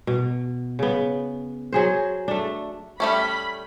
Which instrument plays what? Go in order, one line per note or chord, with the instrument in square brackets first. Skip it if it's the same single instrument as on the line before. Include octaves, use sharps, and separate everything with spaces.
[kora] B2
C#3 B3
F#3 G#4 C5
A3 D4
[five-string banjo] G3 A3 C#4 [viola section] B5